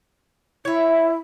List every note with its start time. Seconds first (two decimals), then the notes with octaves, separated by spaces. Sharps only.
0.65 E4 C#5 E5